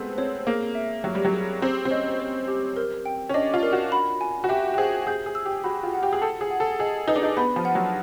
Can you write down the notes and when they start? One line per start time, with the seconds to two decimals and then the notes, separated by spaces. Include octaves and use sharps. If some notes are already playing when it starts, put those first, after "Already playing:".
Already playing: G#3 A3 B3 C4
0.18 C4 C#5
0.47 A#3 G#4
0.75 E5
1.04 F#3 C#5
1.15 G3
1.25 F#3
1.33 G#4
1.62 C4 G4
1.85 C4
1.91 C#4 D#5
2.20 C5
2.48 G4
2.77 A#4
3.06 G5
3.29 C#4
3.34 D4 D#5
3.54 F4
3.63 A#4
3.73 F#4
3.92 B5
4.21 G#5
4.44 F#4
4.49 G4 E5
4.74 G4
4.78 G#4 C5
5.07 G#4 G6
5.26 G#4
5.35 E6
5.46 G4
5.64 F#4 B5
5.83 F4
5.93 F#5
6.03 G4
6.13 G#4
6.22 A4 A5
6.41 G#4
6.51 F#5
6.60 A4
6.80 G#4 D#5
7.08 D#4 B4
7.16 D4
7.23 D#4
7.37 B3 B5
7.56 F3
7.65 F#5
7.75 F#3